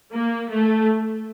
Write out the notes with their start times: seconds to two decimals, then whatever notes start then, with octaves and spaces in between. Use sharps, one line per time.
0.13 A#3
0.51 A3